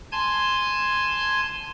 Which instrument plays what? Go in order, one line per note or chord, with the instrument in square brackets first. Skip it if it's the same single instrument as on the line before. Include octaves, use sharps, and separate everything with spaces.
[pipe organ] G#5 A5 C6 G#6